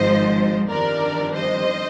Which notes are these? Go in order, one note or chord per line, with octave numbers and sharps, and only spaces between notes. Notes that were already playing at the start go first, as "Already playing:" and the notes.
Already playing: G#1 G#2 F3 C5 D#5
G1 F2 D#3 G3 D4 A#4 D5
C5 D#5